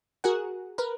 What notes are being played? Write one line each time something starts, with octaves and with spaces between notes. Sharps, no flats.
F#4 G#4 A#4 F#5
A#4 B4